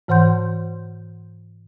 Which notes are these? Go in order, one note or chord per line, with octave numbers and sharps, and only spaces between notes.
G#2 E3 C5 F#5 C6 G6